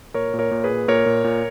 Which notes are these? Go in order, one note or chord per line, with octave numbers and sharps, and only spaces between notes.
A#2 A#4 C#5
A#2
A#4 C#5
A#2
G#4 B4
A#2
A#2 A#4 C#5
A#2
A#2